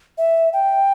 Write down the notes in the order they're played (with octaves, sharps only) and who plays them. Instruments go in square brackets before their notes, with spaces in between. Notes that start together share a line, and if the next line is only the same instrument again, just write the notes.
[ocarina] E5
G5